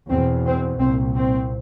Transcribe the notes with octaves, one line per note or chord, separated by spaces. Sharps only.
E2 B2 C4
C4
C2 A#2 C4
C4